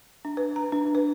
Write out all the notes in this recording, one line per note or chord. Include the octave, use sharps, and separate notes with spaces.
D4
B4
A#5
D4
B4